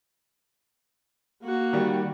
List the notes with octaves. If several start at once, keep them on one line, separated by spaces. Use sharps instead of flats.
A#3 F#4
D#3 G3